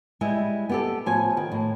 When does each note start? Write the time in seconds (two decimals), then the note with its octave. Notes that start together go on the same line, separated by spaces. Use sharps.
0.21 G3 G#3 E4
0.69 B3 G4 A4
1.06 A2 F3 B3 G#5
1.37 D#3
1.52 A2